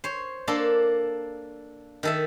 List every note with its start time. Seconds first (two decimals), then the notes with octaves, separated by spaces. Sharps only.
0.04 C5 C#5
0.48 A#3 D4 A4 C6
2.03 D#3 A4 E5